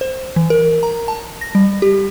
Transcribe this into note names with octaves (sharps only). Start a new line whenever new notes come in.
C5
E3
A#4
A#5
A5
A#6
G3
G4